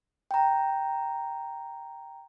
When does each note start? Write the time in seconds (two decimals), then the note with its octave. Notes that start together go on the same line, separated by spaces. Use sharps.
0.31 G5 A#5